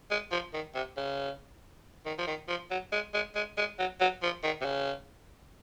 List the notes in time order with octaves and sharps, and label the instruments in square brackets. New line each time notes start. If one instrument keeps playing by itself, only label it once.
[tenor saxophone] G#3
F3
D#3
C3
C#3
D#3
F3
D#3
F3
F#3
G#3
G#3
G#3
G#3
F#3
F#3
F3
D#3
C3
C#3